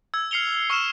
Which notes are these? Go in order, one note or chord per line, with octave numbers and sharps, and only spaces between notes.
E6 G#6
F6 C7 C#7 F7 G7
C#6 E6 F6 C#7 E7